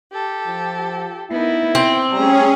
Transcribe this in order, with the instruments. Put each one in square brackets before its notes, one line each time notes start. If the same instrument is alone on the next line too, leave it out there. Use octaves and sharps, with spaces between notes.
[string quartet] G4 A4
[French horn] F3
[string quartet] B3 D#4 A#4 [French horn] E4
[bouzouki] C4 [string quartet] G5
[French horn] G3 [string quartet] A3 A#5 [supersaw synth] C#4 G#4